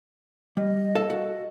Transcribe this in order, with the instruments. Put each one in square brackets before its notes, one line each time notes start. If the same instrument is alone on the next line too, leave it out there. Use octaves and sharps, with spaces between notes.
[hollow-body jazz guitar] G3 [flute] D#5
[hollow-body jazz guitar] A4 F5 A5
F#4